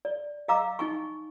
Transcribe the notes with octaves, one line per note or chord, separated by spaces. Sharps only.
D5
D#5 F5 A#5 D6 E6
D#4 G#5 C#6